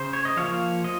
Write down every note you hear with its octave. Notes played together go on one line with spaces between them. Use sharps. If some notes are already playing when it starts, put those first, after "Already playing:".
Already playing: C#3 C5
C#5
D#5
F3 A#3 C#5 F5
F3 D#5